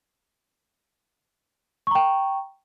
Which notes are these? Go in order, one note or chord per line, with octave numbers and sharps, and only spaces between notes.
G5 A#5 C#6